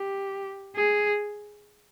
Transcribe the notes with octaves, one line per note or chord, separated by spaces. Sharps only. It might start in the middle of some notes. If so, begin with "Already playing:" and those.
Already playing: G4
G#4